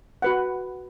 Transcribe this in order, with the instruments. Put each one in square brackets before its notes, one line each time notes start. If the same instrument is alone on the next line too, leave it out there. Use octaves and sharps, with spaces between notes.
[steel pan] F#4 B4 F#5